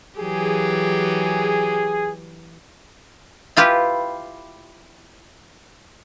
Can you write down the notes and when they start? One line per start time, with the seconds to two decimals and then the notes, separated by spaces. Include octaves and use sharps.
0.18 E3 F#3 G4 G#4
3.57 E4 F4 G4 B4